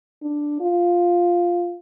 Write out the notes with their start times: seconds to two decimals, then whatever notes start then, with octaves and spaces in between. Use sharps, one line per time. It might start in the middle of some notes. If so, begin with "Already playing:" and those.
0.22 D4
0.60 F4